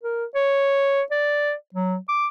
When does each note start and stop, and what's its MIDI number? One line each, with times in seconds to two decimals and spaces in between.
0.03 0.25 70
0.35 1.02 73
1.11 1.54 74
1.74 1.97 54
2.09 2.28 86